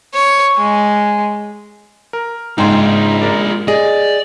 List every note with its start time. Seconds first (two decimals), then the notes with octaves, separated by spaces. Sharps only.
0.14 C#5
0.57 G#3
2.13 A#4
2.58 G#2 C#3 D4 D#4 F4 G5 C6
3.21 G#3 A#4 D5
3.68 G#4 D5 D#5